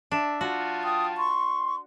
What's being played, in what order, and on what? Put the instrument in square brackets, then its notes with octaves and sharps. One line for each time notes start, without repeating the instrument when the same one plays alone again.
[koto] D4 E5
[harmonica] F4 A5 [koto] F#4
[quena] G5 [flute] D#6
[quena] C6 [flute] C#6